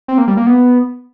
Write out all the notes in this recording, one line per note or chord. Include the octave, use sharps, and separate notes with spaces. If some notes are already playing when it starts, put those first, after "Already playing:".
C4
A#3
G3
A#3
B3